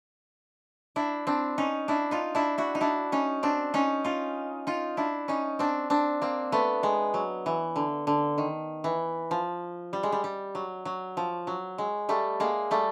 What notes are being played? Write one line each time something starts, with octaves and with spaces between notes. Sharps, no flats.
D4 E4
C4 D4
C#4 D#4
D4 E4
D#4 F4
D4 E4
E4 F#4
D#4
D4 E4
C#4 D#4
C4 D4
C#4 D#4
D#4 F4
D#4 F4
D4 E4
C#4 D#4
C4 D4
C4 D4
A#3 C4
A3 B3
G#3
F#3
E3
D3
D3
D#3
E3
F3
G3
G#3
G3
G3
F#3
F#3
F3
F#3
G#3
G3 A3
G#3 A#3
G3 A3